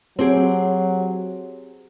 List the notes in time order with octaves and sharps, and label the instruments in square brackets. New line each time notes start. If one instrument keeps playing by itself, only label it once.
[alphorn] F#3 [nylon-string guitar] C4 G4 G#4